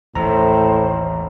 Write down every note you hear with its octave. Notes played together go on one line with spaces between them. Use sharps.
A1 D#2 A2 C5 A#5